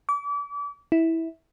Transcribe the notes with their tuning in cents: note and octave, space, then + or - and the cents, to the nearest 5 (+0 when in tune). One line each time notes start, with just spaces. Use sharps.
D6 -35
E4 -15